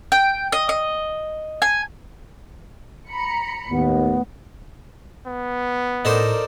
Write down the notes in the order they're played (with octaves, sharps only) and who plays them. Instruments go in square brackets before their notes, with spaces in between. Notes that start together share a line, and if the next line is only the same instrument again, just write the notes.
[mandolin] G5
D#5
D#5
G#5
[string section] A#5 B5 C#7
[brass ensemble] D#2 [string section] A2 [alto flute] B3
[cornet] B3
[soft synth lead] A2 [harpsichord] D#4 A4 C5 [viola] A#4 D5